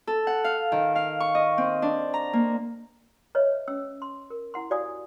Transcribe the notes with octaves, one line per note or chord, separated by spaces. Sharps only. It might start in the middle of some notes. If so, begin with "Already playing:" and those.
A4
F#5
F5
D#3
F5
C#6
D#5
C4
D4
A#5
A#3
B4 C#5 D#5 E5
C#4 E6
C6
A#4
E4 F#5 C6
F#4 G4 D5 F5 G#5 D#6